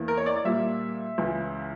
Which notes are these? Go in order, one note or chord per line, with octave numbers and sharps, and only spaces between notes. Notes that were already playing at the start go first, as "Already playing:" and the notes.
Already playing: E2 E3 A#3
A#4
C#5
D5
D5
A#2 G3 A#3 E5
C#2 C#3 E3